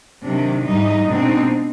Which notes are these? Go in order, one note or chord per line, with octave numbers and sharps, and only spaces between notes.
C3 D#3 F#3 D4
G#2 E3 G3 D#4
B2 G#3 C4 D4 D#4